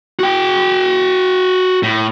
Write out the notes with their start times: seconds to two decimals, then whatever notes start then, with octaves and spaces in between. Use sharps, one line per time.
0.19 F#4 G5
1.83 A2